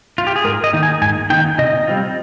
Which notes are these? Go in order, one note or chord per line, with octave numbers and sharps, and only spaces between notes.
F4
G4
G#4
G#2 A#4
D#5
D#3 A#3 D#4
G#5
G#2 G#5
D#3 A#3 D#4 G5
C3 D#5
G3 C4 F4